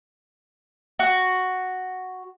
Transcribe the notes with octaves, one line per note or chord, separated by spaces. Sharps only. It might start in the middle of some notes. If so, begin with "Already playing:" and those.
F#4